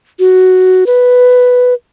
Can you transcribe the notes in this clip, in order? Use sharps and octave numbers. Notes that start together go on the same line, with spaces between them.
F#4
B4